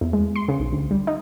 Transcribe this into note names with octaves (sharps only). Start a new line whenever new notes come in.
E2
G#3
C6
C#3
B1
D2
G3
D#4